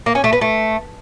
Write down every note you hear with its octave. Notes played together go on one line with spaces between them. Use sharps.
A#3
C#4
A3
B3
A3